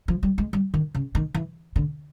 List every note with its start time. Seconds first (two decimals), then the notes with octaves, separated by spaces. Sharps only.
0.08 F3
0.23 G3
0.38 G#3
0.53 G3
0.74 D#3
0.95 C#3
1.15 D#3
1.34 E3
1.76 D3